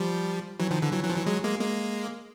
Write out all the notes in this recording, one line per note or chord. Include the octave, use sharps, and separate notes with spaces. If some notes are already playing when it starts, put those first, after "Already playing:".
Already playing: F3 G3
E3 F#3
D#3 F3
D3 E3
E3 F#3
E3 F#3
F3
E3 F#3
F#3 G#3
G#3 A#3
G#3 A#3